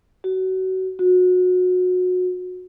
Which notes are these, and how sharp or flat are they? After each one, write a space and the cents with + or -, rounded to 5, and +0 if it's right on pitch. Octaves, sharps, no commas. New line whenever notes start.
F#4 +25
F#4 -25